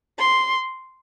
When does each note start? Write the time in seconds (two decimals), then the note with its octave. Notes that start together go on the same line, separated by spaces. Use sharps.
0.18 C6